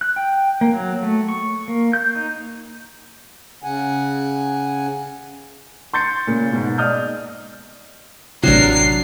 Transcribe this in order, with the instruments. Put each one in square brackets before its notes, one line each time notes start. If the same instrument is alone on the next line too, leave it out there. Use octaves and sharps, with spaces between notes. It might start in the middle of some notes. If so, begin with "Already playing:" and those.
[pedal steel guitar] F#6
G5
A#3
F#3
A3
C#6
A#3
G6
D#4
[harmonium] C#3 F#5 G#5
[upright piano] C6 G6 A6 C#7
A#2 C#3
G#2 B2
D5 D#5 D#6 F6 G6
[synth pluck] A1 C3 [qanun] F#3 D4 A#4 [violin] C7